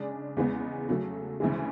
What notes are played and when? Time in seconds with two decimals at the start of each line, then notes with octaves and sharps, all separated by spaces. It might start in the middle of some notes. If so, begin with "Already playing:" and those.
Already playing: C#3 G#3 D4
0.37 E2 C#3 G#3 B3
0.89 C#3 F#3 A3
1.40 D2 C#3 E3 G#3